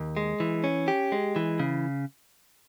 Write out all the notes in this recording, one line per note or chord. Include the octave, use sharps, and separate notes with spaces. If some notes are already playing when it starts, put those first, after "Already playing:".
Already playing: D#2
G#3
E3
C#4
G4
G#3
E3
C#3